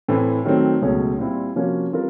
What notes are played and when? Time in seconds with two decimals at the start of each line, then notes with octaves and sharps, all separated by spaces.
0.08 A2 E3 A3 C4
0.45 D#3 F#3 A3 C4
0.81 C#2 B2 F#3 A3 C#4
1.18 A#2 G3 C4 E4
1.55 C3 F3 A#3 C#4 F#4
1.92 E3 G3 C4 F4 A#4